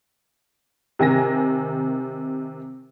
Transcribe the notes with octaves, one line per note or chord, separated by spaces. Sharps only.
C3 D#3 G#5 A#6